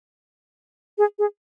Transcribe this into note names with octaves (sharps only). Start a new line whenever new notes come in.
G#4
G#4